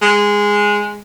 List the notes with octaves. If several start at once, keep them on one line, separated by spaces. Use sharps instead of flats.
G#3